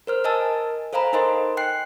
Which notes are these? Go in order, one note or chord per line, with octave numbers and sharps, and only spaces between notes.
A#4 C5 F6
A#4 D#5 G#5 A5 E6
A4 C5 F5 G#5 A#5 B5
D#4 A#4 C5 D#5 G#5 C6
G5 F#6 C7